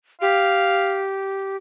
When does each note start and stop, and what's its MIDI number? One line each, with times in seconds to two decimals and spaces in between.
0.21 1.56 67
0.21 1.04 77